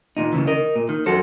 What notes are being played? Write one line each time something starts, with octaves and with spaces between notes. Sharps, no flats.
D#2 A#2 D#4
D#2 C#3 E3
A#4 D#5
A#2
D#3
F#2 F#4 A4 C5